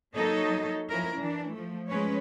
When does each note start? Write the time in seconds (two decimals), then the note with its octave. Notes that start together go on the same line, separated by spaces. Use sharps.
0.15 F#3 A#3 D#4 A4 C#5 D#5
0.90 F3 C#4 E4 A#4
1.19 E3 D4
1.53 F3 A3
1.89 F3 G#3 C#4 B4 C#5